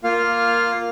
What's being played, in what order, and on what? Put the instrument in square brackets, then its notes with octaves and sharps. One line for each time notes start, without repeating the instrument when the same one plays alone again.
[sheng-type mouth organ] A#3 F4 F5